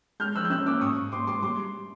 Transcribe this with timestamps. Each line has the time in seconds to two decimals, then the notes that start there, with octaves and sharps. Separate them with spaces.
0.20 G#3 F6 G6
0.36 F3 E6 F#6
0.45 G6
0.50 C#4 E6 F#6
0.66 C#4 D6 E6
0.81 G#2 C#6 D#6
0.96 G#2
1.12 G#2 C6 D6
1.27 G#3 C6 D6
1.43 G3 C6 D6